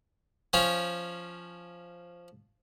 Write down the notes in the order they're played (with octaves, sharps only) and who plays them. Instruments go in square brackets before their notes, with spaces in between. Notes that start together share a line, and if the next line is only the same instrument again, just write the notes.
[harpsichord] F3 C#4 F4